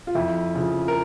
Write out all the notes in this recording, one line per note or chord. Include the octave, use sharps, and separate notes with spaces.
F4
F2 E4
C#3 F3
A#4